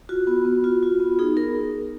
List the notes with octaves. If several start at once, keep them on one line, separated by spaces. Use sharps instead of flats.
F4 F#4
B3
B3
F4
F4
B3
D#4 G#4
B3 A#4